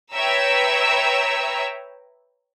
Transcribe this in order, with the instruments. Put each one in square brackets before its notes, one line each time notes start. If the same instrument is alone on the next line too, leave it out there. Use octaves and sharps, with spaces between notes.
[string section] B4 C#5 E5 G5 A#5 E6